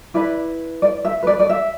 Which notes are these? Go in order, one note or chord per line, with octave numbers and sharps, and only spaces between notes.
E4 B4 D5
D5
E5
B4
D5
D5
E5